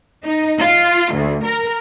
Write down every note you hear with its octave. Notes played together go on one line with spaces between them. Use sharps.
D#4
F4
D2
A#4